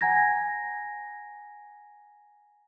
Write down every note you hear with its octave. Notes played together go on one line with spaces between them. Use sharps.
F#5 G#5 A#5 G#6 A#6